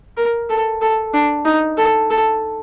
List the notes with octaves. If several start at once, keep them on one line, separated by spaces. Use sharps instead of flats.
A#4
A4
A4
D4
D#4
A4
A4